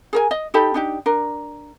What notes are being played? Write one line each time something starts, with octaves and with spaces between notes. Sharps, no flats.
G#4 A#4 G#5
D#5
D#4 G4 A4 B5
D4 D#4 G4
D4 A#4